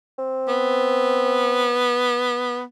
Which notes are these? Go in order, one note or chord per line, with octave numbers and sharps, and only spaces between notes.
C4
B3